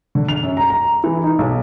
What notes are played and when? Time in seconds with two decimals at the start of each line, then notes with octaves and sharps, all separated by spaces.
0.15 D3
0.29 F7
0.43 F#2
0.57 A#5
0.70 A#5
1.04 E3
1.24 D#4
1.39 B1